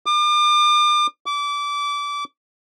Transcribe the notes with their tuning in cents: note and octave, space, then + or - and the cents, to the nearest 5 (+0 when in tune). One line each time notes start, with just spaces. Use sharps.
D6 +40
D6 -25